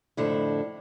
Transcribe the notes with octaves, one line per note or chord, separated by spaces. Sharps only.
F2 A2 D3 E4